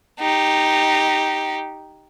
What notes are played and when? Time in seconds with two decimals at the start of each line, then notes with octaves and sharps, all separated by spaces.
0.20 D#4 G4